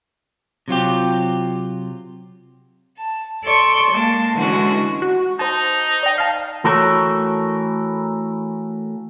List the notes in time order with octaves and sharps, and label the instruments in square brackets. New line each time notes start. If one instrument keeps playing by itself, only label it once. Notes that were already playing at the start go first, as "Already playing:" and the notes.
[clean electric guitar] C3 F#3 F4 G4
[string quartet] A5
A4 D5 C6 C#6
G#3 A#3 A5
D3 E3 G#3 C#4 F#4
[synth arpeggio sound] F#4
[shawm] D#4 [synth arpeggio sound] C5 A5
[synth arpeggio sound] D5 G5
F5 A5
[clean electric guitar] E3 A3 F#4 A4 A#4 C#5